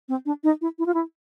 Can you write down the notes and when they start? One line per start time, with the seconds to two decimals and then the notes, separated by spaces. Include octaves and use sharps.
0.09 C4
0.26 D4
0.44 D#4
0.61 E4
0.79 E4
0.86 F4
0.94 E4